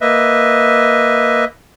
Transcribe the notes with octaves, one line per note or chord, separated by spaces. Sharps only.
A#3 B4 D#5 E5